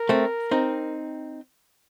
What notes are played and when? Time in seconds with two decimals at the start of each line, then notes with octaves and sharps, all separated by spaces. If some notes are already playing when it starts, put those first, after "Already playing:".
Already playing: A#4
0.09 A3 C4
0.51 C4 D#4